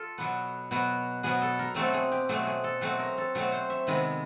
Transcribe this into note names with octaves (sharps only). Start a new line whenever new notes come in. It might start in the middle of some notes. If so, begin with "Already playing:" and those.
Already playing: F4 A4
B2 F#3 B3
B2 F#3 B3
B2 F#3 B3 G#4
A4
A#4
B2 F#3 A3 C4 A4
G#4
G4
B2 F#3 A3 C4 G#4
G#4
A4
B2 F#3 A3 C4 G#4
A#4
A4
B2 F#3 A3 C4 C#5
C5
E5
C3 D#3 G#3 B3